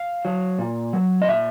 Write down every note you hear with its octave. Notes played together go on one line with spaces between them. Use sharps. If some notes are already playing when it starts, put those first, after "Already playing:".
Already playing: F5
F#3
A#2
F#3
D#5
A#2 E5